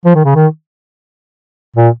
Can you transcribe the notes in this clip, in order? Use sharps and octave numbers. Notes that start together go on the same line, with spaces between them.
F3
D#3
C#3
D#3
A#2